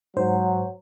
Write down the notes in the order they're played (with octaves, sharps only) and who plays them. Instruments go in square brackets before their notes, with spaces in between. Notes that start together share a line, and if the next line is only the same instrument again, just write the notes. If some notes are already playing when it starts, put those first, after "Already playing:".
[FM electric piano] G#2 C5 [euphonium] F#3